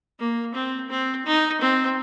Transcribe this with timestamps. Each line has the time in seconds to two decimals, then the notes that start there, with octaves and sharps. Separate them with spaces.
0.19 A#3
0.54 C4
0.90 C4
1.26 D#4
1.61 C4